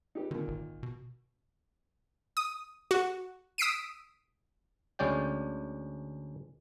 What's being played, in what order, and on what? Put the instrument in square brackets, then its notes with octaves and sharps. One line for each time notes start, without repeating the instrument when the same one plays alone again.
[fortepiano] D#4 G4 B4
[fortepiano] A#2 D#3 [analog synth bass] D3
[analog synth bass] G#1
B2
[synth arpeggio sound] D#6
F#4
D#6 E6 B6 C7 D7 D#7
[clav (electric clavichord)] D2 G#3 C#4 D5 G5